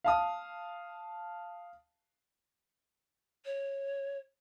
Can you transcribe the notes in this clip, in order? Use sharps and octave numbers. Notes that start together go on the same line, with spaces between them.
F5 A5 D#6
C#5